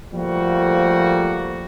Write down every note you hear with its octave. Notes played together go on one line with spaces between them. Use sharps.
F3 G3 A3 A#3 F#4